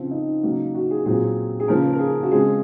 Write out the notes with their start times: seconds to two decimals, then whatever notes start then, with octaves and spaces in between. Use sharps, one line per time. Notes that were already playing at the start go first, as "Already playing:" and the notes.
Already playing: C#3 F3 C4 F4
0.11 D#4
0.43 C#3 F#3 A#3
0.75 F#4
0.91 G#4
1.06 A#2 F#3 C4 G#4
1.60 G#4
1.68 C#3 F3 A#3 A#4
1.93 A#4
1.99 G#4
2.23 F#4
2.31 C#3 G#3 C4 G#4